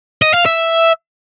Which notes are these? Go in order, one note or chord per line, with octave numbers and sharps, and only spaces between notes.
D#5
F5
E5